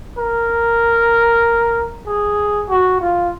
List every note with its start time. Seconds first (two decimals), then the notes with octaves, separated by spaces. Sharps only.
0.18 A#4
2.07 G#4
2.69 F#4
3.00 F4